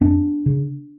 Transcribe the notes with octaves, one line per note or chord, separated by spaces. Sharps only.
F2 B3 D4
C#3